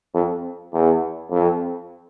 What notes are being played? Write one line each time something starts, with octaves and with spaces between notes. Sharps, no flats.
F2
E2
F2